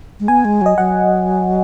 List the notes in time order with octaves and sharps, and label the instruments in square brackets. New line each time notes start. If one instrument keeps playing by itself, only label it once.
[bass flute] G#3
[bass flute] B3 [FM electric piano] G#5
[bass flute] G#3
[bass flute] F#3 [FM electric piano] D#5
[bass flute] F#3 [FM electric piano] F#5